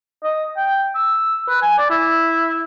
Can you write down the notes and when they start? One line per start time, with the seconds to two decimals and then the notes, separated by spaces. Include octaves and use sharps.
0.24 D#5
0.57 G5
0.95 E6
1.48 B4
1.62 G#5
1.78 D5
1.90 E4